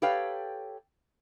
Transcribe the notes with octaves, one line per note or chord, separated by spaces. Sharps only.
G4 A4 B4 C#5 F5 G5